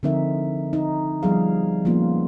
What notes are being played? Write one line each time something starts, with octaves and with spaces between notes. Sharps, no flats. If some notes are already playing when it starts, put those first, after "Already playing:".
D3 F3 C4 D#4 A#4 E5
D#4
F3 G3 B3 G#4 F5
F3 A#3 B3 C#4 F4